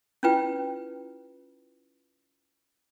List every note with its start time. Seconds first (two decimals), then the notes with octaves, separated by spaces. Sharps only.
0.23 C#4 E4 F4 B4 G5